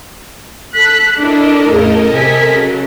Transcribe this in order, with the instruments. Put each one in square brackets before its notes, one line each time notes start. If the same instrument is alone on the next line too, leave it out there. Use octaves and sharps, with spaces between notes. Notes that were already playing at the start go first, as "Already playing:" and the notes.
[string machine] A4 [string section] F#6 B6
[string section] D4 E4 [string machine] A4 A#4 D#5
[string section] E2 A2 C#3
C3 G#5 B6
C#3 F#3